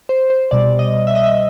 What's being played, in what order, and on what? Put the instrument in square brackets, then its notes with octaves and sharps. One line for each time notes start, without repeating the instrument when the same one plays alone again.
[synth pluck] C5
C5
C2 B2 G3 D5
D#5
E5
D#5
E5